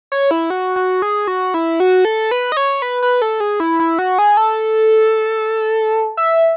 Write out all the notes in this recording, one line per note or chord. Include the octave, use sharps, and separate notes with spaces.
C#5
E4
F#4
F#4
G#4
F#4
E4
F#4
A4
B4
D#5
C#5
B4
B4
A4
G#4
E4
E4
F#4
G#4
A4
E5